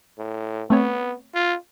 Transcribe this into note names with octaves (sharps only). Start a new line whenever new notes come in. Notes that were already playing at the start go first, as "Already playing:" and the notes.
A2
A3 B3 C4 C#5
F4